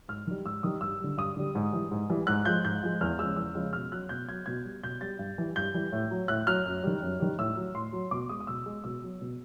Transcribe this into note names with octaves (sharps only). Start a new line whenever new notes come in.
G#2 F6
D#3 G3
G#2 E6
D#3 G3 D#6
G2 E6
D3 G3
G2 D#6
D3 G3
G#2
E3 G3
G#2
E3 G3
G#2 F#6
F3 G#3 G6
G#2 G6
F3 G#3
E2 F6
C#3 F3 G#3 E6
E2 E6
C#3 F3 G#3
B2 F6
F#3 F#6
B2 G6
F#3 G#6
B2 G#6
G3
B2 G6
G3 A6
G2
E3 G3
G2 G6
E3 G3
A2
F#3
A2 F#6
F#3 F6
F#2
D#3 G3
F#2
D#3 G3
A2 E6
F#3
A2 C6
F#3
B2 D6
G#3 D#6
D#6
B2 E6
G#3
B2 E6
F#3
B2